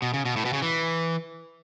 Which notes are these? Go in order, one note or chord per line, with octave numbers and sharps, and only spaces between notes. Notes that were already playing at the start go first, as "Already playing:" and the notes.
B2
C#3
B2
A2
B2
C#3
E3